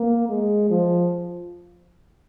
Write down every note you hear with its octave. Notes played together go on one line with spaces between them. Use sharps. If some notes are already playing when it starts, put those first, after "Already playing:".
Already playing: A#3
G#3
F3